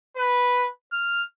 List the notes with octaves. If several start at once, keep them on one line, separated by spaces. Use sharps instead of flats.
B4
F6